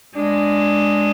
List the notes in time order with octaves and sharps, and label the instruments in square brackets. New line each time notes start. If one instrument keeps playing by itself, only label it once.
[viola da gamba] G#3 [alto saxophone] D4